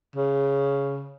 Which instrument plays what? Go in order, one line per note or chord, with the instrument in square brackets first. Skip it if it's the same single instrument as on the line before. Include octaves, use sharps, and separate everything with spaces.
[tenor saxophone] C#3